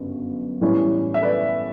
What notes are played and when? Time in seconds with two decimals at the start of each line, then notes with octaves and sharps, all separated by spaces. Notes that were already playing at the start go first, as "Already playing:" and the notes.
Already playing: G1 F#2 C#3
0.61 A2 E3 G3 C#4 E4
1.14 E5
1.22 B4 D5